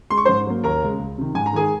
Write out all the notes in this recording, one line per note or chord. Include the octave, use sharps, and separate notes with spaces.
G#3 C6
C#6
G#2 C5 C6
F#3 A#3
D#2 A#4 A#5
C#3 G#3
C#2
C3 D#3
G#2 G#5
A#5
D#3 G#3 G#4 G#5